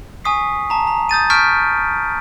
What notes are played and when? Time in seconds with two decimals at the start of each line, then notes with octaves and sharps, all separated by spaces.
0.25 G#5 C#6 D#6 B6 C7
0.70 A5 A#5
0.87 A#5
1.09 D#6 G6 A6 D#7
1.30 A5 C#6 F6 G6 B6 D7